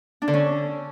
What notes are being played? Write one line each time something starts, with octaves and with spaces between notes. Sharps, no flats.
D4
D3
C#4